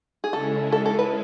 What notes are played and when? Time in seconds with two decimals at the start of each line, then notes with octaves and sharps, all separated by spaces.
0.24 G#4
0.33 C#3 G#3 C#4 E4 A4
0.72 A4
0.86 A4
0.99 B4